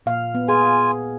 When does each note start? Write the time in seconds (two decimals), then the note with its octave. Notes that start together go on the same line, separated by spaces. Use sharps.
0.06 A#2 F5
0.35 B3
0.48 F4 G#4 G#5